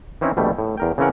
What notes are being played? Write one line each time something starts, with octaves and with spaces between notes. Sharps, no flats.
E3 C4 C#4 D#4 E4
A#1 B2 G3 A3
A2
E2 A#4 G5
C#3 E3 C4 C#4 A#4 F#5